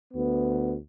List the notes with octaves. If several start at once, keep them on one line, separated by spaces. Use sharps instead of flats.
D2 B3